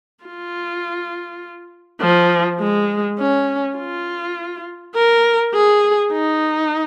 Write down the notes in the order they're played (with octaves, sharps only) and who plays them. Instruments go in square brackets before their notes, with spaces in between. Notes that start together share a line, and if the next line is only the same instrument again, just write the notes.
[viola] F4
F3
G#3
C#4
F4
A#4
G#4
D#4